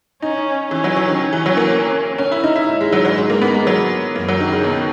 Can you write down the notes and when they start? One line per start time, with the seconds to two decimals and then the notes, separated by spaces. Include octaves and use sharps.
0.22 C#4 D#4
0.71 E3 C#4
0.84 F#3
0.96 F#3
1.08 D#3
1.21 C#4
1.33 E3
1.46 F#3
1.57 A#3
2.18 C#4
2.32 E4
2.44 D#4
2.56 E4
2.68 G#2
2.81 G#3
2.92 F#3
3.05 F#3
3.18 G#3
3.30 A#3
3.42 B3
3.54 G#3
3.67 F#3
4.16 F#2 A#3
4.28 F#3
4.40 D#3
4.52 C#3
4.64 B2